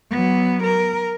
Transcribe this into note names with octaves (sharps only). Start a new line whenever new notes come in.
F#3 B3
A#4